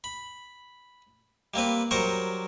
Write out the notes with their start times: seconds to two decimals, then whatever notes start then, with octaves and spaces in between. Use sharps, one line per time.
0.04 B5
1.54 G3 A#3 C4 B4
1.91 F#3 G3 A#4 C5 C#6